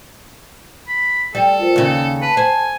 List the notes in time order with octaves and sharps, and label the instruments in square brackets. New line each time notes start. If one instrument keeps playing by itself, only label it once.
[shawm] B5
[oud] G3 [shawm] A4
[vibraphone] F4 A#4 C5
[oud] D#2 C#3 [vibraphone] C#4
[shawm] B4 [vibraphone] A5
[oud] C5 [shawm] G#5